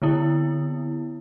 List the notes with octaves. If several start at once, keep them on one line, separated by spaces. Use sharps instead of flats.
D3 B3 E4